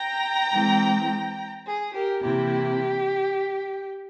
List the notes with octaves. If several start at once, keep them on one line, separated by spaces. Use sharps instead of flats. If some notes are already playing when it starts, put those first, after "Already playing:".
Already playing: G5 A#5
E3 G#3 C4
G#4
G4 A#4
C3 E3 A#3 E4 G4